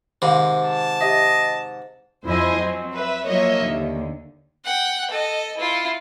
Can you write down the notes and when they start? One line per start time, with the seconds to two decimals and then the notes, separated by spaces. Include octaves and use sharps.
0.22 G#2 C3 D#3 F5
0.63 A5
1.01 G4 D#5 E5
2.26 F2 F3 E4 C5 D#5 G#5
2.59 F#3 C4
2.94 B4 E5
3.26 F3 F#3 A#3 C#5 D#5 E5
3.60 D#2 D3
4.64 F#5 G5
5.11 A4 D#5
5.57 E4 F4